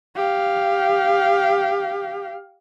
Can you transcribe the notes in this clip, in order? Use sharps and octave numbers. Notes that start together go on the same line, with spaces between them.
G4 F5